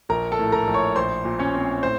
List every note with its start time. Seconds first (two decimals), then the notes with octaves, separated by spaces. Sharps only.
0.09 A#1 A#4 A#5
0.32 A4 A5
0.39 A2
0.52 A#4 A#5
0.67 A#1
0.74 C#5 C#6
0.96 A#1 C5 C6
1.25 A#2
1.39 C#4 C#5
1.55 C4
1.83 A2 C5